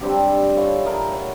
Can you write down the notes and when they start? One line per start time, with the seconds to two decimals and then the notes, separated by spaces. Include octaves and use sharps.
0.01 G3 C4 D4 G4
0.56 E4 F4 A4 C#5
0.85 G#4 A#4 G5 A5
1.12 C#5 F#5 C#6